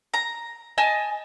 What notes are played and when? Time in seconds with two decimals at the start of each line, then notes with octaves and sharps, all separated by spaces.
0.14 A#5
0.78 D#5 G#5 A5